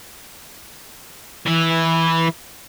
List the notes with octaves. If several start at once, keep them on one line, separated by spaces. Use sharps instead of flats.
E3 E4